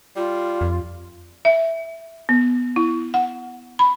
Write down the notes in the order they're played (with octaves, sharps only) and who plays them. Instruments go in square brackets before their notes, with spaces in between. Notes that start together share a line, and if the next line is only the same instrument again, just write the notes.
[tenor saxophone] G3 [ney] F4
[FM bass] F2
[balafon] E5
B3
E4
F#5
B5